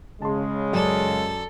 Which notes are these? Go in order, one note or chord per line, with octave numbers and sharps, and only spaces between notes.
C#3 G#3 A5 C6
F#2 A4 D5